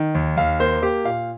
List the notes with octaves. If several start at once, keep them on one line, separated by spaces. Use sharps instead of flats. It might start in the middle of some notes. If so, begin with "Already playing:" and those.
Already playing: D#3
D#2
D#2 F5
A#3 C5
A#3 G4
A#2 F5